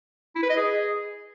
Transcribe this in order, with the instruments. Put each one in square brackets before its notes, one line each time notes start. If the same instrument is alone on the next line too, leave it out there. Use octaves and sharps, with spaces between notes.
[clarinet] E4
B4
D#5
G#4